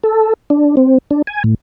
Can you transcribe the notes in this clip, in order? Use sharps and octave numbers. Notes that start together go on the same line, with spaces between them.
A4
D4
C4
D4
G#5
A2